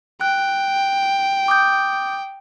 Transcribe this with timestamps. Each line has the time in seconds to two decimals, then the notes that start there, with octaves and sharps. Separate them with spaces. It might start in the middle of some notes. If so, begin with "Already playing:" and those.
0.21 G5 F#6
1.48 D6 D#6 G6